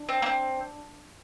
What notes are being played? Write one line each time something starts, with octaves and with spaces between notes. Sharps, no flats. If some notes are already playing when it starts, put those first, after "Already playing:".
Already playing: D4
C4
A#3
C4